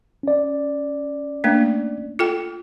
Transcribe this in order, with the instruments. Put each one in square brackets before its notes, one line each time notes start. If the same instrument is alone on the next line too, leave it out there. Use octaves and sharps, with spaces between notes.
[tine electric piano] C#4 D5
[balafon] A3 A#3 D4
F4 A4 G5